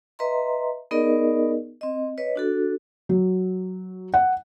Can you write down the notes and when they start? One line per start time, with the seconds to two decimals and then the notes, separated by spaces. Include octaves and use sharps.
0.19 B4 D#5 E5 A#5 C6
0.91 B3 D#4 G#4 A#4 D5 D#5
1.81 C4 D#5
2.18 B4 C#5 D#5
2.36 D4 F#4 A4
3.09 F#3
4.14 F#5